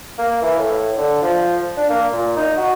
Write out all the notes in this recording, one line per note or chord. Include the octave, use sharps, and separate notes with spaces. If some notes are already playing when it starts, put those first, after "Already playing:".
A#3
E3
A2
D3
F3
D4
A#3
A#2
D#4
F#4